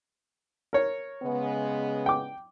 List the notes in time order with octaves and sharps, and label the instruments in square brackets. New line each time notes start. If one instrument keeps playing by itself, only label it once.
[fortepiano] A#4 C#5
[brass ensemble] C#3 G#3 B3
[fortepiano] G5 D6